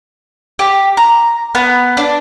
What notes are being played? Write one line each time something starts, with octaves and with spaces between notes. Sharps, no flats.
G4
A#5
B3
D4